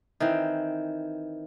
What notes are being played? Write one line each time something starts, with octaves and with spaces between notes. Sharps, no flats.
D#3 E3 C4